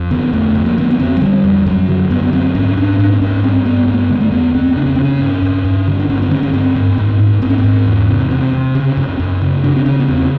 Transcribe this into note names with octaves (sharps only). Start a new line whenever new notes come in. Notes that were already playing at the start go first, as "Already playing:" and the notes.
Already playing: F2
D3 B3
F2 A3
F2
A#3
D3 B3
B3
D3 C4
F#3
D3 G3
F2
F#2 F#3
D3
F#2 B3
B3
F#2 C4
G#2 C#4
G#2 D4
G#2 D4
C4
G#2 C#4
G2 C4
G2 B3
G2 C4
A#3
B3
D3 G#3
A3
F2 B3
F2 C4
C#3 D4
C#4
C#3 C4
C#4
G2
G2
G2
D3
D4
G2 C#4
C4
D3 C#4
C#4
G2 C4
G2
G#2
G#2
G#2 C4
C#4
C4
G#2
E2
C3
C3 C4
C3
C#3
F#2
F#2
C#3
C#3 D4
C4
C#3 C#4
B3
E2 C4